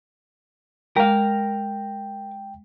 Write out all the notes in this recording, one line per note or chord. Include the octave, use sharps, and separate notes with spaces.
G#3 A#4 F5 G5